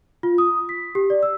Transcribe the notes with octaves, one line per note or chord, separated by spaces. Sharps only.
F4
D#6
B6
G4
D5
E6